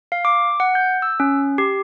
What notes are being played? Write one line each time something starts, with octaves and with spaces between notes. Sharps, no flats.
F5
D6
F#5
G6
E6
C#4
G4